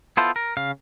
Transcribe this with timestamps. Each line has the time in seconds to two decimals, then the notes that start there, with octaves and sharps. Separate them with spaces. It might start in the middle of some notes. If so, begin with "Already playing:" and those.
0.17 B3 E4 F4 A4 C5
0.36 A#4
0.57 C#3 F5